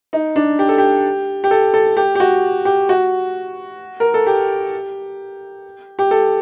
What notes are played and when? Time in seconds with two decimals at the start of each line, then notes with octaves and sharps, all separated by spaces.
0.13 D#4
0.36 D4
0.59 G4
0.69 A4
0.78 G4
1.44 G4
1.51 A4
1.74 A4
1.97 G4
2.15 G4
2.20 F#4
2.65 G4
2.89 F#4
4.00 A#4
4.14 A4
4.27 G4
5.99 G4
6.11 A4